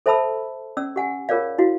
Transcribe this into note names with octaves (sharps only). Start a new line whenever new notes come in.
A4 C5 E5 A5 B5 E6
C#4 D5 E6
G4 F#5 G#5
F4 G#4 A#4 C#5 D5 F5
E4 F#4 F5